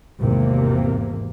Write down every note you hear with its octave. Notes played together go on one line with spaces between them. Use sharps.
G#1 E2 C3 A#3